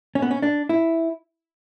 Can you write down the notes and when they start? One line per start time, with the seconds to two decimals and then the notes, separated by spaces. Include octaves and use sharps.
0.15 C#4
0.22 B3
0.31 C#4
0.42 D4
0.69 E4